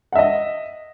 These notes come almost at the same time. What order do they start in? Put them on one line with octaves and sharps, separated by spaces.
F#5 E5 D#5